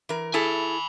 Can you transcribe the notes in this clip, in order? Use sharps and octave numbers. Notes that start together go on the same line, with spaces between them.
E3 A#4
E4 G#4 A4 G#5 B5